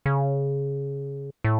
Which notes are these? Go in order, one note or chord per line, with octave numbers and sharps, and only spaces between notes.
C#3
A2